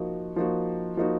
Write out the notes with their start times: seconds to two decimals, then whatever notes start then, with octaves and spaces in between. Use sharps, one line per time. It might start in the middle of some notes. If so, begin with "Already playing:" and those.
Already playing: F3 A#3 D#4 F#4
0.36 F3 A#3 D#4 F#4
0.97 F3 A#3 D#4 F#4